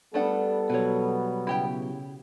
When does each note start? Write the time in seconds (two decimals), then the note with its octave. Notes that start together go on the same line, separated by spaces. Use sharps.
0.14 G3 A3 B3 D4 A4 F#5
0.70 B2 F#3 B4 C#5
1.47 C#3 E4 G4 G5